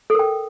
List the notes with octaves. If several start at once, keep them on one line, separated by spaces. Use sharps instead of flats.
A4 A#4 G5